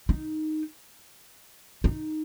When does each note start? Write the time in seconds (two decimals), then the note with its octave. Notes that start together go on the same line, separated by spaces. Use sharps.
0.09 D#4
1.84 D#4